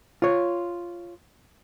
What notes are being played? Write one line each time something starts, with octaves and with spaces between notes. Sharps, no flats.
F4 C#5